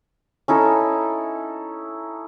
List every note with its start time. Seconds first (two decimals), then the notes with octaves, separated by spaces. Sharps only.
0.48 C#4 D#4 E4 A4